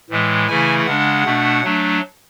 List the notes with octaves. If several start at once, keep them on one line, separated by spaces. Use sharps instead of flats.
A2 E3 G#3
C#3 E3 A3 E4 G#5
C#3 G#3 D4 F#5
B2 A3 D4
F#3 A3 D4